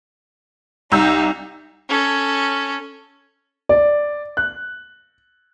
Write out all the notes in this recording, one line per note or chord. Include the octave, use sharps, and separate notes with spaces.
C2 D#4 E6 G6
C#4 A4
D5
F#6